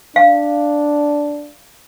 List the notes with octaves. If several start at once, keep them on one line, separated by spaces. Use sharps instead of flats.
D4 F5